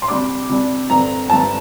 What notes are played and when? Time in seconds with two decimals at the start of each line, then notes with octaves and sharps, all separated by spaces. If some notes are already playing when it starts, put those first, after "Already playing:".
0.02 C6
0.08 C3 G3 D4 D6
0.49 C3 G3 D4
0.90 G2 D3 G3 C4 A#5
1.29 G2 D3 G3 C4 A5